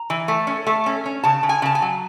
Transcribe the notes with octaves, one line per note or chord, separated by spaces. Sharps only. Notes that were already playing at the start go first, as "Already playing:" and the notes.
Already playing: A#5
E3
A3
C#4
A3
C#4
C#4
C#3 A5
C#3
G#5
C#3 A5
G#5
F#3